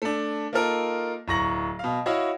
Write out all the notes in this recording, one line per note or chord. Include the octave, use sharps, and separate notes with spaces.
A3 D4
A#3 D#4 F4 A4 A#4
D1 A#5 C#6 A#6 F#7
B2 F5
E4 F#4 C#5 D#5 F5